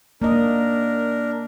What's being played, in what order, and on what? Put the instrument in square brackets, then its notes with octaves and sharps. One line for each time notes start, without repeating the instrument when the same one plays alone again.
[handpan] A#3 D#5 [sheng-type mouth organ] D4 A#4